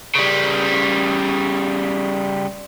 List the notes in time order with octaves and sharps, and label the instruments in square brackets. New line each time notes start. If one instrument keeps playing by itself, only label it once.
[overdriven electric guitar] C#3 G3